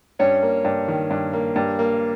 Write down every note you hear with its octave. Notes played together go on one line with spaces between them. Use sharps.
G2 C#4 C#5
A#3
G2
D#3
G2
A#3
G2
A#3